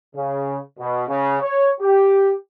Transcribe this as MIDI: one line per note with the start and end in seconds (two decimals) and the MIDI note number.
0.15 0.58 49
0.78 1.04 47
1.08 1.37 49
1.42 1.70 73
1.81 2.33 67